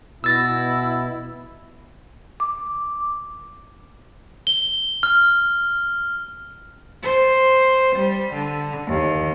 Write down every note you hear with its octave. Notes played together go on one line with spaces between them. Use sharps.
B2 B3 E4 E6 A6 A#6
D6
G7
F6
C5
G3
D3
D#2